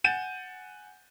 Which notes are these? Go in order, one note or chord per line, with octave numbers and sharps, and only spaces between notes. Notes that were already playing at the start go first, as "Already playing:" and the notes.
F#5 G#5 G6 A6 D#7 E7